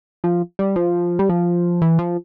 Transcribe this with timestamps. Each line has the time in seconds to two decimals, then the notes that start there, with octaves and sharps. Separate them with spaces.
0.24 F3
0.59 G3
0.76 F3
1.19 G3
1.29 F3
1.82 E3
1.99 F3